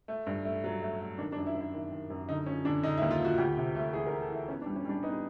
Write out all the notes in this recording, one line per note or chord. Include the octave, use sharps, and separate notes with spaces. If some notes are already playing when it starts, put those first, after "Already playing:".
A3
G2
A3
F#3
A3
A3
D#3 D4
D4
F#2
E4
F#2
E4
D#3 E4
D#3
F#2
D3 D#4
F3 C#4
D3 D4
D3 D#4
E4
D#2
F4
F3 F#4
D2 G4
C3
A3
E3 G#4
A#4
E3
A4
E3 E4
B3 C#4
D4
G3
C#4
G3 D4
B3 D#4